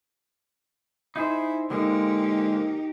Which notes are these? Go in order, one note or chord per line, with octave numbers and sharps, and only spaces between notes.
D#4 E4 G#4 C5
D3 F3 G#3 A#3 D#4 G4